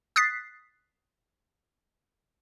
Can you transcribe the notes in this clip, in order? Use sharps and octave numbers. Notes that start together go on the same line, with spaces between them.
D#6 F#6 A6 B6 C7